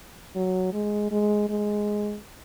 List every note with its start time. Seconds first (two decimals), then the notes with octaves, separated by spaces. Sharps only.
0.36 F#3
0.73 G#3
1.11 G#3
1.49 G#3